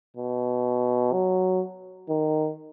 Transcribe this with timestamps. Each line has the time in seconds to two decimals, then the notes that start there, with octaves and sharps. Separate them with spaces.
0.17 B2
1.12 F#3
2.09 D#3